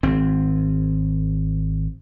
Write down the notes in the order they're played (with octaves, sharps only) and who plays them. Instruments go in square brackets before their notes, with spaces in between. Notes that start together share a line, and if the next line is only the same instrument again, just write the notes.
[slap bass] G#1 C4